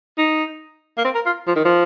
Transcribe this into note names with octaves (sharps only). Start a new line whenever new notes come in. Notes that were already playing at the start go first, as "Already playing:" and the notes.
D#4
A#3
C4
A#4
F4
F3
D#3
F3